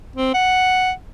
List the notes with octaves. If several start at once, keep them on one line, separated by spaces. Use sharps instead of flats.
C4
F#5